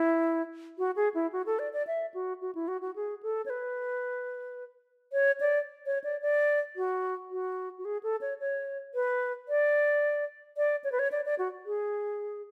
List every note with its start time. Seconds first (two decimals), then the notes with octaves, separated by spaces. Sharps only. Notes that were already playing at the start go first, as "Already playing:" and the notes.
Already playing: E4
0.78 F#4
0.96 G#4
1.14 E4
1.33 F#4
1.46 A4
1.59 D5
1.73 D5
1.87 E5
2.14 F#4
2.41 F#4
2.55 E4
2.68 F#4
2.82 F#4
2.96 G#4
3.23 A4
3.46 C#5
3.50 B4
5.13 C#5
5.41 D5
5.86 C#5
6.04 D5
6.22 D5
6.76 F#4
7.31 F#4
7.78 F#4
7.85 G#4
8.03 A4
8.21 C#5
8.39 C#5
8.95 B4
9.49 D5
10.57 D5
10.84 C#5
10.92 B4
10.99 C#5
11.12 D5
11.25 D5
11.39 F#4
11.66 G#4